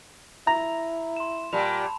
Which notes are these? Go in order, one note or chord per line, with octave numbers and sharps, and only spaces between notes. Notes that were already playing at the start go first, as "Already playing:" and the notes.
E4 A#5
C6 E7
A#2 G3 A5 B5 F7